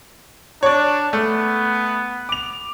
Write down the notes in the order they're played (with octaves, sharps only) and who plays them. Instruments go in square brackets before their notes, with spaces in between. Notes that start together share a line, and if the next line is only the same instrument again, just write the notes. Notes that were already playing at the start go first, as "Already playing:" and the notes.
[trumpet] D4 [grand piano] C#5 D5
[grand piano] A3 [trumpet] B3
[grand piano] D6 F7